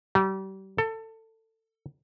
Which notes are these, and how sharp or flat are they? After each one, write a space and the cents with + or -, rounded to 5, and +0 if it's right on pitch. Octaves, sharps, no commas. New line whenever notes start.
G3 -35
A4 +20